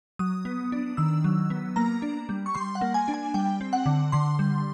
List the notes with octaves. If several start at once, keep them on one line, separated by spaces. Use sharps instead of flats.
F#3 D#6
B3
D4
D#3 E6
F#3
B3
A#3 A#5
D4
G3
C#6
G3 C6
F#5
A#3
G#5
D4
G#5
G3 G5
C4
F#5
D3
D3 C6
G3